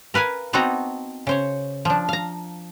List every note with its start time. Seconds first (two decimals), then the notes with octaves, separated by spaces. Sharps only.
0.14 A#4 B4 F5 G#5
0.53 B3 C4 D#4 F#4 A5 A#5
1.27 C#3 C5 C#5
1.85 F3 D4
2.09 F5 A#5